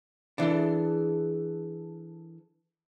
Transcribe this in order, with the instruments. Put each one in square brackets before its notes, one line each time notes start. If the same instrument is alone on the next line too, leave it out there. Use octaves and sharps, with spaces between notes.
[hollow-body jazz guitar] E3 D4 [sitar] G#4 A4